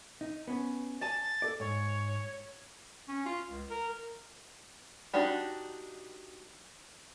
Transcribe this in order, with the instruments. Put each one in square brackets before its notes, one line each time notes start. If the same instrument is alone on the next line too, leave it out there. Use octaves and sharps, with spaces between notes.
[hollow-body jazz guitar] D#4
B3 C#4
[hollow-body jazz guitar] D5 G#5 A5 [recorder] A6
[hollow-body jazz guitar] A4 D5
[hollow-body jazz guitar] G#2 [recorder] C#5
[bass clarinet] C#4
F4
C#2
A#4
[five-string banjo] D4 D#4 F#4 G4